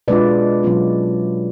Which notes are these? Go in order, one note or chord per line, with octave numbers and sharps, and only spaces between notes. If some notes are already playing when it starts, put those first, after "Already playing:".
B2 G#3 D4 F4 B4 D5
B2 F#3 C#4 F4